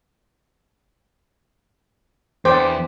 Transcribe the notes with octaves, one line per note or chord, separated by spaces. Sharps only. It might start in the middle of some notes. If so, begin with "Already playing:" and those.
E2 D3 E3 G4 C5 D5